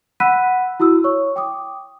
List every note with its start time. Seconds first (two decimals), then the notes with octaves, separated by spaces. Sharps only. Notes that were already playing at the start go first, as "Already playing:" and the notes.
0.20 F#5 B5 E6 F#6 B6 D#7
0.80 E4 F#4 D#6 E6
1.04 C#5 C#6
1.36 G5 D6 D#6